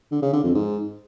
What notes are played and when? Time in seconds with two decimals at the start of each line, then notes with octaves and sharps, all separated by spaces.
0.11 D3
0.22 C#3
0.33 D3
0.44 F2
0.54 G#2